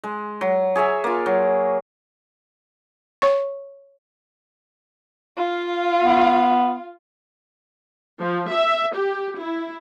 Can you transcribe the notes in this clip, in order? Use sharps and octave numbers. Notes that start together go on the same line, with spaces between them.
G#3
F#3
G#4 C#5 E5 G#5
A#3 F4
F#3
C#5 C#6
F4 F5
B3
F3
E5
G4
E4